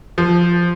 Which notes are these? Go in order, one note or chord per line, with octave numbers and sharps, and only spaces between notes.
F3